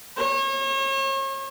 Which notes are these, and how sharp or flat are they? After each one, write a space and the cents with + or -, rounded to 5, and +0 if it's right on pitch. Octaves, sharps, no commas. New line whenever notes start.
C#5 -40